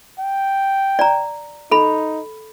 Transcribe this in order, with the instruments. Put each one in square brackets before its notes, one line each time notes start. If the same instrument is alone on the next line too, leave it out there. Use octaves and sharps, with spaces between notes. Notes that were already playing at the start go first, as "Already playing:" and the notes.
[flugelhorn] G5
[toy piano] D5 A#5
[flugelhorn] D#4 [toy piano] A4 B5